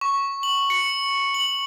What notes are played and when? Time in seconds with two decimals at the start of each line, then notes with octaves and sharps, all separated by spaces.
0.01 C#6
0.43 F#7
0.70 C#7
1.34 F#7